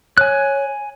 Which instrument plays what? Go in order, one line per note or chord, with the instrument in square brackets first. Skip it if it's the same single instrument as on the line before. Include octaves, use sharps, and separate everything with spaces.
[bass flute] C#5 [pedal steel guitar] G#5 F#6